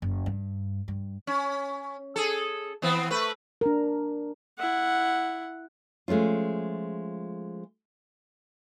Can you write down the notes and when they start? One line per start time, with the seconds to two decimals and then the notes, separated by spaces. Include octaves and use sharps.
0.02 F#1
0.26 G2
0.88 G2
1.27 C#4
2.16 G#4 A4
2.82 E3 B3 C4
3.10 A3 B4
3.61 D4 A#4
4.58 E4 F#5
6.08 F3 G#3 A3 C#4 F4